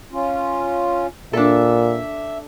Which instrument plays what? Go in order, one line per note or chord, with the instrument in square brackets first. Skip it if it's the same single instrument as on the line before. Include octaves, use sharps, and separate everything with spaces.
[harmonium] C#4 F4
[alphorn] A#2 [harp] D4 A4 [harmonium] E5